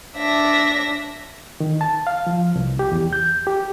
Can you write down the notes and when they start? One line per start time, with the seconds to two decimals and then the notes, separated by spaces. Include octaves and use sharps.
0.15 D4 E5 A#6
1.60 D#3
1.81 A5
2.07 F5
2.27 F3
2.56 C2
2.79 G4
2.92 E2
3.13 G6
3.47 G4